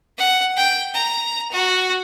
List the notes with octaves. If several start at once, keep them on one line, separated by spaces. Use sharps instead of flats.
F#5
G5
A#5
F#4